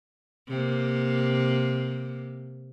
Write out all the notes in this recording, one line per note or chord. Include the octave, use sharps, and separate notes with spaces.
C3 A#3